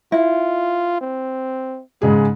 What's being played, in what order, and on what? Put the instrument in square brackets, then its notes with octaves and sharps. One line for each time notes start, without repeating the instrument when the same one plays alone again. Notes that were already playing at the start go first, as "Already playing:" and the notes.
[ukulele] E4 [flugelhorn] F4
[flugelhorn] C4
[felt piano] G#2 C#3 G#4 [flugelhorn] G#3